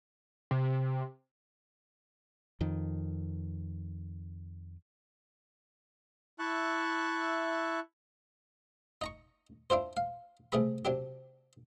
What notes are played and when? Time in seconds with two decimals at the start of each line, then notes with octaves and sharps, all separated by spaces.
0.51 C3
2.61 F2 D#3
6.39 E4 E5 A5 C#6 F#6
9.01 D#4 A#5 C#6
9.70 D4 E4 F4 C5
9.97 F5
10.52 C2 C3 A3 G#4 B5
10.85 C3 F#3 D4 G4